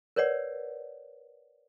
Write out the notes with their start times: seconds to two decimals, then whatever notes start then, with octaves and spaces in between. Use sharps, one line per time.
0.16 A#4 B4 C#5 D5 F#5